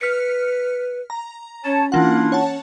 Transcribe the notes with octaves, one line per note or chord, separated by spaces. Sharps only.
B4 F6 B6 C#7
A#5
C#4 C#5 A5
E3 A#3 D4 E4 F4 F#5
C#5 F#5 A5